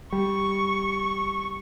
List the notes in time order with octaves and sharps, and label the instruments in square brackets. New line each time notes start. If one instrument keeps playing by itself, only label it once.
[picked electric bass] G3 [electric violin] C#6